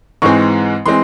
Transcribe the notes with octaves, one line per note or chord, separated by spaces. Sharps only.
G#2 E3 G#3 C4 C#6
E3 G#3 C4 C6